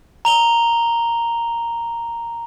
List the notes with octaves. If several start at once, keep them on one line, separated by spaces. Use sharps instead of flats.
A#5 F7 G7